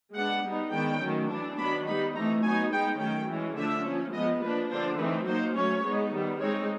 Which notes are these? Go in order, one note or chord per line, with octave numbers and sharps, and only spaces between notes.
G#3 B3 D4 F#5
G3 B3 D#4
D#3 G#3 B3 D4 G5
D#3 F#3 A3 C#4
E3 A3 D4
D#3 F#3 B3 D4 B5
G3 B3 D#4 B5
E3 A3 C4 D#4 A#5
F#3 B3 D#4 G#5
G#3 B3 D#4 G5
D#3 F#3 A3 C#4 G5
E3 G#3 C#4
D3 F3 A3 D4 E5
F3 A#3 C#4
F3 G#3 B3 D#5
F3 A#3 D4 B4
D3 F3 A#3 D4 C5
E3 A3 C4 D#4 B4
F#3 A#3 D#4 C5
F#3 A3 C#4 C#5
G#3 B3 D#4
D#3 G3 B3
G#3 C4 D#4 C#5